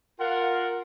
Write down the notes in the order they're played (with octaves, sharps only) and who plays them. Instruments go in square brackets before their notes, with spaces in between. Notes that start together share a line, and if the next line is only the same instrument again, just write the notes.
[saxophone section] F4 A#4 [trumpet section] F5 F#5